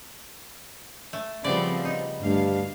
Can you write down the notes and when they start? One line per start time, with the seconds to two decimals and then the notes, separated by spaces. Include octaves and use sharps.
1.13 A3
1.45 C#3 F3 G3 B3 C4 D5
1.85 D#4
2.20 D2 G2 F5